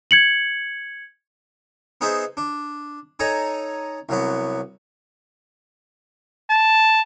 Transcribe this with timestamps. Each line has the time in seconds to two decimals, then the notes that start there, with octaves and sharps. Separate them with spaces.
0.11 G#6 C#7 F#7
2.01 B3 D#4 G#4 C5 E5
2.37 D4
3.20 D#4 A4 C#5 G#5 A#5
4.09 C2 F#3 B3
6.51 A5